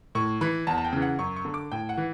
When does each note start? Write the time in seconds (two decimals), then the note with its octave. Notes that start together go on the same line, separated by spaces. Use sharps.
0.15 A2 C#6
0.41 E3 B5
0.67 E2 A5
0.78 A5
0.84 G5
0.92 C#3 E3
1.02 F#5
1.19 F#2 C#6
1.36 C#6
1.45 D3
1.54 D6
1.72 A2 G5
1.89 F#5
1.97 E3